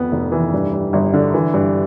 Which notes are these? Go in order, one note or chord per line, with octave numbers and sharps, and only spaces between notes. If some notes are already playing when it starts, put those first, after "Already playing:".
Already playing: F2 B3
F1
E3
G2
G3
G1
D3
E3
G2